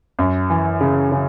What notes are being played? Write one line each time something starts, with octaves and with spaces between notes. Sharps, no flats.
F#2
E3
C#3
C#3